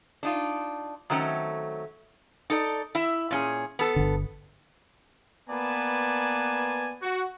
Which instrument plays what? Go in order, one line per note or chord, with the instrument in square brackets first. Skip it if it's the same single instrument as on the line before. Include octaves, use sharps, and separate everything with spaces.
[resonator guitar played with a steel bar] D4 D#4 F4
D#3 F#3 A3 C4 C#4
D#4 A4 D5
E4 E5
A#2 C#4 G#4
B3 A4
[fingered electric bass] G1 D3
[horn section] A#3 B3 B4 D5 G#5 A5
F#4